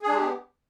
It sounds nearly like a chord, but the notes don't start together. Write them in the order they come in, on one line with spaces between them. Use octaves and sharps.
G#4 D4 G#3 G4 B3